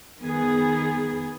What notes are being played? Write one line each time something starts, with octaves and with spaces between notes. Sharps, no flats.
D#3 B3 G#4